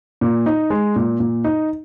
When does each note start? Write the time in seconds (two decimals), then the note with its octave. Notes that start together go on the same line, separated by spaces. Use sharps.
0.21 A#2
0.46 D#4
0.70 G#3
0.96 A#2
1.20 A#2
1.44 D#4